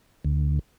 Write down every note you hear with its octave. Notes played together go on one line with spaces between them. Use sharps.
D2